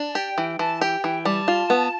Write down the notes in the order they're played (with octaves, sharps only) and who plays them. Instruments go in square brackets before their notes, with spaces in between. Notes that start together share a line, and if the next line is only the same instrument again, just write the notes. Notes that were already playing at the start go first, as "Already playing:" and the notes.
Already playing: [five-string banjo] D4
[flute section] A5
[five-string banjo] G4 [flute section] G5
[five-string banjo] E3
[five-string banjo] E3 [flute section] A5
[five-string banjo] G4 [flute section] G5
[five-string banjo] E3 [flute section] G5
[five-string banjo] G3 [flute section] A5
[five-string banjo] F4
B3